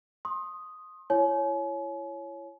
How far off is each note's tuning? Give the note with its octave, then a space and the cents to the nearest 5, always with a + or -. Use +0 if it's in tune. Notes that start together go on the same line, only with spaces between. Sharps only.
C6 +25 D#6 +0
E4 +35 C#5 +0 G#5 +40